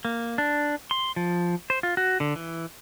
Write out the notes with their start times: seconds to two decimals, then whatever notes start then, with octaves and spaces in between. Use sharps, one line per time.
0.05 A#3
0.38 D4
0.91 C6
1.16 F3
1.70 C5
1.83 F4
1.97 F#4
2.20 D3
2.36 E3